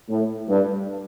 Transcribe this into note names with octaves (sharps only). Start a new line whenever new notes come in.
A2
G2